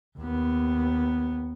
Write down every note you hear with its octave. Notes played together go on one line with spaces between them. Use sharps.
D#2 B3